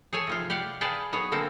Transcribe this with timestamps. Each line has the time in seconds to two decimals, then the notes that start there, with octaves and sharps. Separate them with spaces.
0.13 G#4 A4 C#5 G#5 A5
0.27 C3 F3 F4
0.50 G4 D5 F5 F#5
0.81 G#4 B4 D5 F5 G5 A5
1.13 F#3 B3 G#4 C#5
1.32 D3 A#3 C4 A4